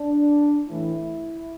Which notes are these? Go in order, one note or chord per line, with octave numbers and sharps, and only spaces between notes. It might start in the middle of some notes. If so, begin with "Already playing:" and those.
Already playing: D4
A2 E3 E4